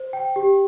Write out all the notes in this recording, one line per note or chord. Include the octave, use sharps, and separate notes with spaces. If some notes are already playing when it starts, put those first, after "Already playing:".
Already playing: C5
G5
G4